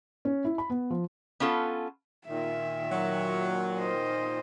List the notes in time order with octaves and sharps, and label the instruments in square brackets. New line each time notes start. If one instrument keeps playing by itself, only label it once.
[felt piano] C#4
E4
B5
B3
F3
[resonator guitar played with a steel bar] B3 C#4 F4 A4
[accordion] A#2 D#3 [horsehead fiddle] E5
[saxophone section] F#3
[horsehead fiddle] C5 D#5